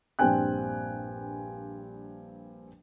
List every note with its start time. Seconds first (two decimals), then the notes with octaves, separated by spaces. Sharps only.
0.19 A#1 G2 C4 G5 G#5 F#6